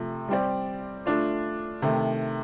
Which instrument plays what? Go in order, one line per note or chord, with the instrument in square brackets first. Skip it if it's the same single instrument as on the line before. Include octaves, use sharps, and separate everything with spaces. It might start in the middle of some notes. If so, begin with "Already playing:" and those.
Already playing: [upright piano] C3 F3 A3
G3 C4 G4 D5
A3 D4 F4
C3 D#3 A3